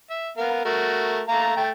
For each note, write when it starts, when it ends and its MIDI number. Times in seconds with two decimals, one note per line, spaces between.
0.10 0.30 76
0.37 0.62 59
0.37 0.62 70
0.37 0.62 77
0.65 1.21 57
0.65 1.21 66
0.65 1.21 70
1.28 1.56 57
1.28 1.56 77
1.28 1.56 82
1.56 1.71 57
1.56 1.71 79